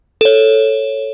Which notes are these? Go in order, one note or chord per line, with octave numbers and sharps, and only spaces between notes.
A4 C#5